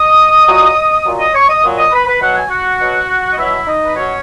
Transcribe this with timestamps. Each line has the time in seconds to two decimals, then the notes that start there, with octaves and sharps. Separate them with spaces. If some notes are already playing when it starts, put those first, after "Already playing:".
Already playing: D#5 D#6
0.47 A#2 F#3
1.04 A#2 F#3
1.19 D#5 D#6
1.33 C#5 C#6
1.48 D#5 D#6
1.63 A#2 F#3
1.77 D#5 D#6
1.91 B4 B5
2.07 B4 B5
2.20 B2 F#3 F#5
2.35 G#5
2.48 F#4 F#5
2.79 B2 F#3
3.32 D#5
3.37 B2 F#3 E4 E5
3.65 D#4 D#5
3.86 B4
3.95 B2 F#3 C#4 C#5